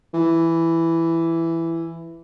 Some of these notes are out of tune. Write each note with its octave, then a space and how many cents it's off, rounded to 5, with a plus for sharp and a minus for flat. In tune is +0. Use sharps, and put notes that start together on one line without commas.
E3 +5